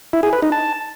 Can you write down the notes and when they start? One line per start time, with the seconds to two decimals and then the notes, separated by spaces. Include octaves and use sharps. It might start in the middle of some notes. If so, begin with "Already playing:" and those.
0.13 E4
0.23 G#4
0.33 B4
0.42 D#4
0.52 A5